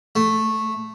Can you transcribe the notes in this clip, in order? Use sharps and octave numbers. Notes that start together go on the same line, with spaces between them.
A3